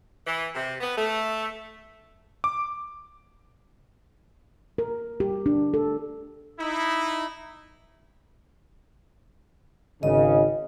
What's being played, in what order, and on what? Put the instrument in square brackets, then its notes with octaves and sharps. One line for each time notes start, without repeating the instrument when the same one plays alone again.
[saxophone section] E3
C3
B3
A3
[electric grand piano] D6
[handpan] A#4
G4
D4
A4
[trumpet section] D#4 E4
[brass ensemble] G#1 C#3 [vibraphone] D#5